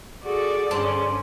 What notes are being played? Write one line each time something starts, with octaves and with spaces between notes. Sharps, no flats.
F#4 G#4 A4 D5
G2 D3 C#4 C5 A5 C6